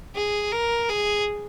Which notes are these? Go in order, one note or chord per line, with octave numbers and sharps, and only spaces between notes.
G#4
A#4
G#4